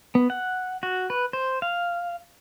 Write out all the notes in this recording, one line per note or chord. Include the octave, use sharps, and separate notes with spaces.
B3
F#5
F#4
B4
C5
F5